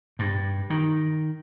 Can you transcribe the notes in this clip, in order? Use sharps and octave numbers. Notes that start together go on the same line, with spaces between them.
G2
D#3